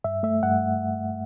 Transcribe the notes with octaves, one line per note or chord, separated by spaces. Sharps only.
G2 E5
A3 E5
G2 F#5